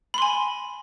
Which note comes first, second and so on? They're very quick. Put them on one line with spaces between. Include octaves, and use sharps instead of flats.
B5 C6 G#5